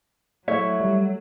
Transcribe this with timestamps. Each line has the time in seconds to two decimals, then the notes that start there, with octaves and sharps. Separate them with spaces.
0.48 F#3 A3 E4 C#5 E5
0.80 G3